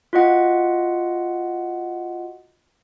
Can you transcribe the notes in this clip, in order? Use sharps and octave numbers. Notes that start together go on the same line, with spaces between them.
F4 F#4 D#5 F#5